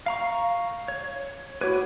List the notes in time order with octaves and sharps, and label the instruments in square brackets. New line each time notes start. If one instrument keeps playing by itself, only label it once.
[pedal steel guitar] F5 A#5 C#6
C#5
[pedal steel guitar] E4 G4 B4 [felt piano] F#4 C#5 G#6